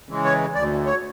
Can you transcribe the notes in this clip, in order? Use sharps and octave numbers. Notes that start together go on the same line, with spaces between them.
C#3 E3 G#3
C#5
D2 D5
C#5